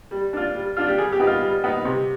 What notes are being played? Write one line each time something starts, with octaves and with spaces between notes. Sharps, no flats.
G3
D4 F4
G3
D4 F4
G4
G3 G#4
G4
B3 D#4
F4
G3
B3 D#4
C3